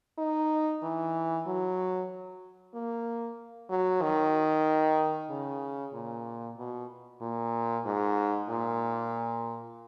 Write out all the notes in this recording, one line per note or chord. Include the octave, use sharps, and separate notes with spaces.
D#4
E3
F#3
A#3
F#3
D#3
C#3
A#2
B2
A#2
G#2
A#2